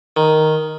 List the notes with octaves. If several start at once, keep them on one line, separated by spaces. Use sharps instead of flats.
D#3